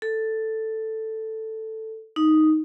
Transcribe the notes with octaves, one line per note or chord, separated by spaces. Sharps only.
A4
D#4